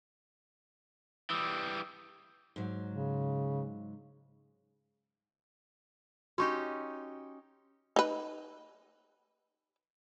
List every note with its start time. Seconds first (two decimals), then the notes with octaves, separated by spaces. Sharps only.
1.30 E3 G3 D#6 E6
2.56 G#2 F#3
2.89 C#3
6.38 C#4 D#4 F#4 G4 C#6
7.96 D#4 B4